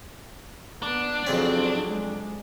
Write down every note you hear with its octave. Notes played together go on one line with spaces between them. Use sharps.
B3 D4
F2 C#3 F#3 C4 C#4
G#3 D4